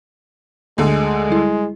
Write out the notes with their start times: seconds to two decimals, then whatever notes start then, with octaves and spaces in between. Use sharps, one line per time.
0.78 D2 D3 G#3
1.30 G3 E4